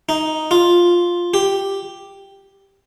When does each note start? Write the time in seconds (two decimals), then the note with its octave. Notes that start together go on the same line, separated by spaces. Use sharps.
0.09 D#4
0.51 F4
1.34 G4